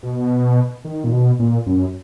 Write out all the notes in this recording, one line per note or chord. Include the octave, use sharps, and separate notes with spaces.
B2
D#3
A#2
B2
A#2
F#2